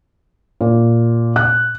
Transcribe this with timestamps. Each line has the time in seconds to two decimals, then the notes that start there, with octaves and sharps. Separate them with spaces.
0.61 A#2
1.36 F#6